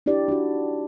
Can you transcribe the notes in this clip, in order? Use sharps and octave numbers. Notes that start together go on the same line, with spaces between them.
D4 E4 G4 D5
D4 D#4 F#4